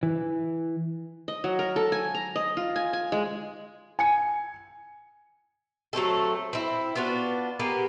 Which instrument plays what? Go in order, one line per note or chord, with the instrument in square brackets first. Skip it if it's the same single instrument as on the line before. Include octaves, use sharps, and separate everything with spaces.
[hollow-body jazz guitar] E3
[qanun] D#5
F#3
A#4
A4
G#5
A#5
D#5
F4
G#5
G#5
G#3
[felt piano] G#5 C#7
[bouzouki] F#3 A3 C4 A4
C4 E4
B3 D4 F4 F#4
A#3 B3 G4 G#4